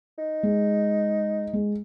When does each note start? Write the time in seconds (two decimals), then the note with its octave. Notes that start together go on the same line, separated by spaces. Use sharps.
0.18 D#4
0.43 G#3
1.53 G#3